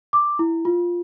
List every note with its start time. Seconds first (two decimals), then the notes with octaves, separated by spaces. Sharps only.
0.13 D6
0.39 E4
0.65 F4